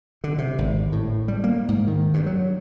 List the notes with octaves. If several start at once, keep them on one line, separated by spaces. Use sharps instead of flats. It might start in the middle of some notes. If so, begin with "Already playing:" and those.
D3
C3
G#1
A2
G3
A#3
G#2
D#3
G2
F#3